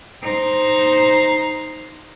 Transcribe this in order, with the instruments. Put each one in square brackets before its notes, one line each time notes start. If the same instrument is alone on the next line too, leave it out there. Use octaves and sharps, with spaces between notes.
[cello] D#4 C5